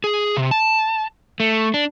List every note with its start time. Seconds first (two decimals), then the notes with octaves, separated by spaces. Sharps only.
0.04 G#4
0.37 C3
0.51 A5
1.40 A3
1.74 D4